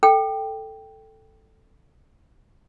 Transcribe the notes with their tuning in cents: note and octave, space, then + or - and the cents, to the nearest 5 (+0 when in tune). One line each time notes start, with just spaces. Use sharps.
A4 +0 G5 +0